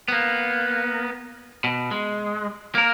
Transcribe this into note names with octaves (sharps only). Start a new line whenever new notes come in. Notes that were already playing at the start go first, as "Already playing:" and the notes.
A#3 B3
B2
G#3
A#3 A#4